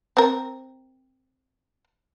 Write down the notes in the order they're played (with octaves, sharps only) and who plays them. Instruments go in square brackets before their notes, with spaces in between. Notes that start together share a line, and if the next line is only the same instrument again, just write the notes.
[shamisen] C4 A#4